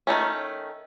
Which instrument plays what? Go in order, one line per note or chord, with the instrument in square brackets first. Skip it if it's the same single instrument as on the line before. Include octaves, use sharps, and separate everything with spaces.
[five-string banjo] D#3 G3 A3 C#4